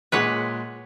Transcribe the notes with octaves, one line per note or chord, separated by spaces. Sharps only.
A#2 G#3 G#4 B4 C#5 F#5